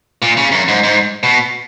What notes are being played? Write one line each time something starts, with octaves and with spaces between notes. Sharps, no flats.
A#2
C#3
F#2
G#2
G#2
B2